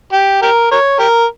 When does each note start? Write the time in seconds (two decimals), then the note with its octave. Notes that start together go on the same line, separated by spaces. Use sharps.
0.13 G4
0.42 G4 A#4
0.71 A#4 C#5
0.99 G4 A#4